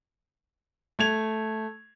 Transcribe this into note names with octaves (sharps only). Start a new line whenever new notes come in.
A3 G#6 F7